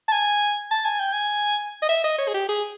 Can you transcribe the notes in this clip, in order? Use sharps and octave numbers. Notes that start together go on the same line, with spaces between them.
A5
G#5
A5
G#5
G5
G#5
D#5
E5
D#5
C#5
G#4
G4
G#4